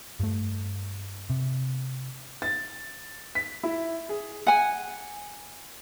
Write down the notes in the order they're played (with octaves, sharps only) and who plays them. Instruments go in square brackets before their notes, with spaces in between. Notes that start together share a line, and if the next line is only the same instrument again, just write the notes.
[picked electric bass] G2 A3
C3
[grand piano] A6
B6
E4
G#4
[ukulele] F#5 G#5